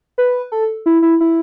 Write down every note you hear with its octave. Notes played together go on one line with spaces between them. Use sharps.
B4
A4
E4
E4
E4